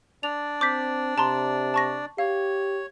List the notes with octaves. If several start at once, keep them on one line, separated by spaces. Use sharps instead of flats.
D4 D5 F7
C4 D6 G6 B6
C3 A5 A#5 C6
A5 C#6 A#6
G4 C#5 F5